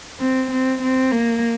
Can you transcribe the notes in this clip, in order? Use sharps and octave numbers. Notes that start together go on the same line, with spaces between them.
C4
C4
C4
A#3